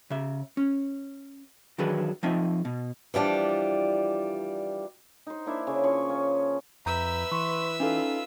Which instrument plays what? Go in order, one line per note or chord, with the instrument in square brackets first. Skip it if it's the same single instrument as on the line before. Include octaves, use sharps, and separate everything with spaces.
[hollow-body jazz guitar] C#3 E5
C#4
D#3 E3 F#3 D4 G#4 B4
F3 C4 D#4 D#5 E5
B2
[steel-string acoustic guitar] E3 F3 G3 D4
[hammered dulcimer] D#4 C5
A#3 D4 E4 E5
C#3
F3 C#4 C#6
C#4
[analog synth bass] F2 [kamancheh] B4 [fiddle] E5 E6 [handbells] A#5 G6
[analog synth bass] E3 [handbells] C6 C#6
[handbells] C#4 D#4 A4 [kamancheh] F4 B4